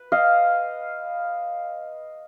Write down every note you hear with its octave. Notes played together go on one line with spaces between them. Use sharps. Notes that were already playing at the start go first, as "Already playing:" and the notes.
Already playing: B4
D#5 F5